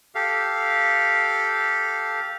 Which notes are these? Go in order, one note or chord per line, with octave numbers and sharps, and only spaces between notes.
G4 A4 F5